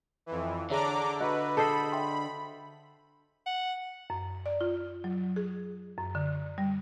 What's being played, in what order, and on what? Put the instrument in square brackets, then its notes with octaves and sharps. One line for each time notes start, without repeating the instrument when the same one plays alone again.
[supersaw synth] F2 E3
[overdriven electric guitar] D3 [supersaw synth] D4 A#5 D6 [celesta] G#4 C#5 E5
[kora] F#4 [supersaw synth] B4 [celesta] D#5
[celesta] G#4 A5 C7 [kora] A4 C5 D#5 [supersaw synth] B5
[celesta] E5 G5 C6
[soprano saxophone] F#5
[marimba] F#2
D5
F4
F#3
G#4
F#2
D3
G3